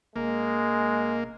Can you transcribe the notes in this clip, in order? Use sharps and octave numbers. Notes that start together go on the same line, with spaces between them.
E1 G#3 A#3